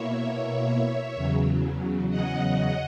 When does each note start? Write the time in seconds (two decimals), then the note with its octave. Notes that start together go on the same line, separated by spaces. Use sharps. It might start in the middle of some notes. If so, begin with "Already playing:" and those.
Already playing: B2 A#3 E4 C#5 E5
1.15 E2 C#3 F#3
2.09 D#5 F#5